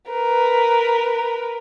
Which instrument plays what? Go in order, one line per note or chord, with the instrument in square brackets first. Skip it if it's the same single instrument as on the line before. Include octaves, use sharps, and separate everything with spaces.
[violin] A#4 B4